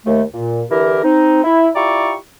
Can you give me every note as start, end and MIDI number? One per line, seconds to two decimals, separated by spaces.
0.06 0.23 39
0.06 0.23 57
0.34 0.63 46
0.70 0.99 50
0.70 0.99 52
0.70 0.99 64
0.70 0.99 67
0.70 0.99 70
1.04 1.43 60
1.04 1.43 63
1.44 1.69 64
1.75 2.15 64
1.75 2.15 65
1.75 2.15 67
1.75 2.15 74
1.75 2.15 82
1.75 2.15 85